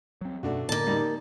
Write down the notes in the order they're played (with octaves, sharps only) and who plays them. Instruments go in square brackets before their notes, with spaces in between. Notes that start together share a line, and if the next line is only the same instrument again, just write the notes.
[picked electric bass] F#3 C4
[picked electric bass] F#2 B2 [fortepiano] A3 D4 F#4
[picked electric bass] A2 D3 [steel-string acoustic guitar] A#3 A5
[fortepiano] G3 D#4